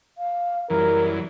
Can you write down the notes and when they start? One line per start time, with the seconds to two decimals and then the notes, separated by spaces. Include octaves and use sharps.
0.17 F5
0.70 F#2 E3 G3 A#4